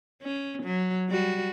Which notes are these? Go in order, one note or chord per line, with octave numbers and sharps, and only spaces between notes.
C#4
F#3
G3 F#4